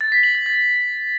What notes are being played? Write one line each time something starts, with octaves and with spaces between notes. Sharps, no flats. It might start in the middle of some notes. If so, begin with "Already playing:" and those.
A6
B6
F#7
A6
A6